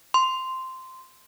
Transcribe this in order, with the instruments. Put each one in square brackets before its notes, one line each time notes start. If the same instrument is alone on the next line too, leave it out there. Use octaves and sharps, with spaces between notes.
[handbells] C6